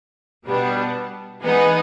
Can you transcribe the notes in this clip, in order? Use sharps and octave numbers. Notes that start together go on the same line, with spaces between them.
B2 G3 B3 D4
E3 G#3 B3 D#4 G#4